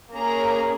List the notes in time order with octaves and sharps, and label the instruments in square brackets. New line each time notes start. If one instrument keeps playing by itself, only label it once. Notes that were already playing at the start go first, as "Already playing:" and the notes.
[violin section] A#3 C#4 G#4 A#5